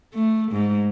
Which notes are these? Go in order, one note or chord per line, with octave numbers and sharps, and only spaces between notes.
A3
G#2